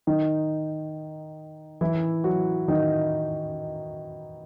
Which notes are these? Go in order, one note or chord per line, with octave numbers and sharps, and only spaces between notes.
D#3 D#4
E3 E4
F#3 F#4
D#3 D#4